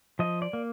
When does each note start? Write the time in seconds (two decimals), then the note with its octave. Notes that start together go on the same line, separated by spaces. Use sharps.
0.19 F3 D#5
0.42 D5
0.53 A#3